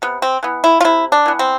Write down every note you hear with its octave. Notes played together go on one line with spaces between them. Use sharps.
C3 B3
C4
E3 B3
E4
F4
C3 E4
D4
E3 B3
C4